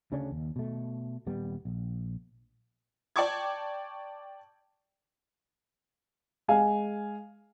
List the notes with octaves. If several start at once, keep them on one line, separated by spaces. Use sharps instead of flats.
D2 C#3 C#4 D4
D#2
B2 A3
D#1 G3 B3
A#1
D5 G5 A5 C#6 D6 G#6
G#3 F5 G#5